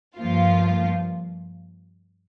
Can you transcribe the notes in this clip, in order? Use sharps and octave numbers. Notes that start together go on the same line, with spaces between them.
G2 F3 A#3 F4